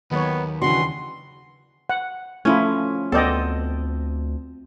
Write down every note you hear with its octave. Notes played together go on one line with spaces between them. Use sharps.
D#2 D#3 F#3 B3 C#5
C#3 E3 D4 F#4 C6
F#5
F3 A3 C#4 E4 F4
D2 B3 C4 A4 D5 D#5